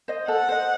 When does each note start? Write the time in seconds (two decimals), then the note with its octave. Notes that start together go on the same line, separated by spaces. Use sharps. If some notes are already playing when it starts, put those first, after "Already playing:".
0.08 C5 D#5
0.28 A4 F#5
0.49 C5 D#5